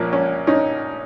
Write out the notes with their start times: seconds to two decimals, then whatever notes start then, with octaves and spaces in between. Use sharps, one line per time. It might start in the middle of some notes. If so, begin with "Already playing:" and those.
Already playing: A#1 A#2 F3 A#3 C#4
0.13 C#4
0.47 C#4 D#4